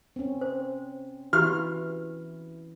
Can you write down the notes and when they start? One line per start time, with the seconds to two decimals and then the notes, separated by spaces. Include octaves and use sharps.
0.16 C4 C#4
0.41 C5
1.33 E3 E4 F#4 G4 F6